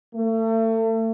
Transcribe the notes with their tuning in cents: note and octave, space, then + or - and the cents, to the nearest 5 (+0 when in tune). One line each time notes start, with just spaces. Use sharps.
A3 +35